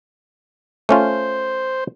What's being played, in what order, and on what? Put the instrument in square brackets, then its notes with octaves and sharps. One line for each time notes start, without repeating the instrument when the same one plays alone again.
[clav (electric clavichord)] A3 C#4 F4 [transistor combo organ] C5